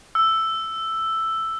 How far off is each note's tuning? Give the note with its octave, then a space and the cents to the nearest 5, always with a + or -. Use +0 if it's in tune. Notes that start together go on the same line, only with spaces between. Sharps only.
E6 +5